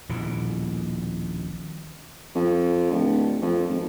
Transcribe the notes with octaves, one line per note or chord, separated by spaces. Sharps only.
D#1 A#1 B2 E3
F2
D1
F2
G#1